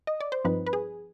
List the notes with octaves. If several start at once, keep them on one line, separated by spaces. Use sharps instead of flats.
D#5
D5
C5
G2 F3 C4 D#4 B4
B4
G#4